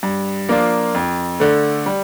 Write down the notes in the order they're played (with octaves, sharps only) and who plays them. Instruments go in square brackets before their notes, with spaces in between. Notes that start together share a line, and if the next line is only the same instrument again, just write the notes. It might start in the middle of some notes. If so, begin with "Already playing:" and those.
[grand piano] G2
F3 A#3 D4 F4
F2
D3 A3
G3